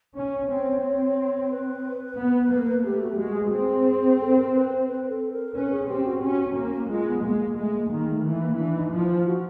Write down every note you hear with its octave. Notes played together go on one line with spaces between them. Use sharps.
C#4 C#5
C4
C4
B4
B3
A#3
A3 G4
F#4
G4
G#3 F#4
G#4
C4
A4
A#4
B4
C5
B4
A4
A#4
C#4 B4
G#4
C4 G4
F#4
C#4
A#3
G#3 F4
B3
G#3 A#3
A#3
G#3 A3
A#3
D#3 A#3
A3
E3 A3
A#3
E3 D4
D#4
F3 E4
F4
F#4